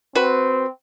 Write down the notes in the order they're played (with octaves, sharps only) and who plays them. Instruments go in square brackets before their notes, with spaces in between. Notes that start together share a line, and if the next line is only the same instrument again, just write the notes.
[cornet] C4 [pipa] F#4 B4